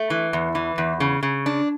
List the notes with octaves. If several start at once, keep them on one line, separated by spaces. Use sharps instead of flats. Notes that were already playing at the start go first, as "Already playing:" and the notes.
Already playing: A3
E3
E2
E3
E2
C#3
C#3
D4